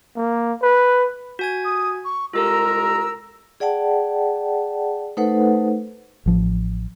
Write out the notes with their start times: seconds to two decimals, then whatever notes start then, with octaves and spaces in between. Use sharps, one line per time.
0.16 A#3
0.62 B4
1.39 F#4 G#5 G#6
1.65 D#6
2.05 C#6
2.33 C2 G#3 F4 G4 A4 A#4 E6
3.60 G#4 D5 F#5 G5 A5
5.17 A3 D#4 A4 B4 C5 F#5
6.26 A1 F3